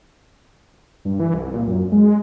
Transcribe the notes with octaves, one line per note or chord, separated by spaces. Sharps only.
G2
E3
C2
A#2
F#2
G#3